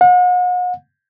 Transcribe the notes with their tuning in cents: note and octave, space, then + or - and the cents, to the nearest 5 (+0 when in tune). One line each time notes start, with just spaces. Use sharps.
F#5 -40